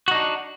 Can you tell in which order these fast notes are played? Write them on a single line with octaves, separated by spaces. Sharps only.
F#4 D#4 D4